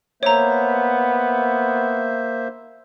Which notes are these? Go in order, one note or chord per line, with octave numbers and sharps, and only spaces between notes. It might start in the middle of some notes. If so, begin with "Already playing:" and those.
A#3 B3 C5 C#5 E5 A#5